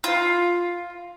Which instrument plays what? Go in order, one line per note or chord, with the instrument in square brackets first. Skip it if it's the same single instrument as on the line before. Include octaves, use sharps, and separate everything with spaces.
[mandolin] F4